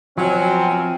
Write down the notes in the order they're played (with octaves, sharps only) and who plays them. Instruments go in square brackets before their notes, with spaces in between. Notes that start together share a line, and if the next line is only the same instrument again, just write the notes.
[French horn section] B2 C4 [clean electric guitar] F3 [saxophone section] F#3 [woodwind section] E5 F5 G#5